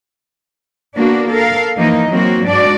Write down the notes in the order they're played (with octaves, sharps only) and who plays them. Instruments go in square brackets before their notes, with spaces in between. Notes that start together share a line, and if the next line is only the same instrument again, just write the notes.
[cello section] A#3 B3 D4 F#4
A4 A#4 F5
E3 F3 A#3 D#4
F#3 A#3 C4 F#4
G#2 D4 F#4 D5